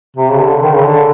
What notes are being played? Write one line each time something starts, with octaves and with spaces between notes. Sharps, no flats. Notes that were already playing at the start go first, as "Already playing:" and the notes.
C3
C#3
D3
D#3
C#3
D3